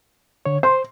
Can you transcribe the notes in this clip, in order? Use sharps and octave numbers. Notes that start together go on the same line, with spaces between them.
D3 C#5
C5 C6